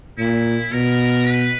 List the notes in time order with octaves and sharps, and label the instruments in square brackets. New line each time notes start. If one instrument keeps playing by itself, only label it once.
[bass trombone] A#2 [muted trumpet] E4
[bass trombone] B2 [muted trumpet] A#4
[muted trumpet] B4